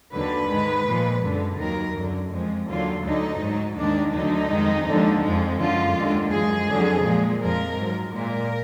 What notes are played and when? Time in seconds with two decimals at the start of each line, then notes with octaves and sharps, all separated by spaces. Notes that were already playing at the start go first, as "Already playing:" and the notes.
0.14 D#2 D3 F#3 B4
0.50 G#2 D#3 G#3
0.87 A#2 F3 G#3
1.23 F#2 D3 G#3
1.59 D#2 D#3 F#3 A#4
1.95 F#2 D3 F#3
2.32 F2 F3 G#3
2.68 D#2 D3 F#3 F4
3.04 D2 D3 F#3 D#4
3.41 G#2 F#3
3.77 D#2 D#3 G#3 D4
4.14 D2 D3 F#3 D#4
4.50 F2 D#3 G#3
4.87 D#2 D3 F3 G#3
5.23 F2 F3 G#3
5.59 F#2 D3 F3 F4
5.96 D#2 D3 G#3
6.32 F#2 F3 G#3 G#4
6.69 F2 D3 F#3
7.05 A#2 F3 G#3
7.41 F2 F3 G#3 A#4
7.77 G#2 F#3
8.14 A#2 G#3 A#4